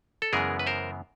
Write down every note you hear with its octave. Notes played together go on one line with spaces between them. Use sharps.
A4
F#2 C#3 E3 G#3 B3 G#4 A#4
B4
A#4 C5